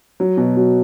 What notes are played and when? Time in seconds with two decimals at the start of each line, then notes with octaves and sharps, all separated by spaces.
0.20 F#3
0.37 B2
0.56 F#3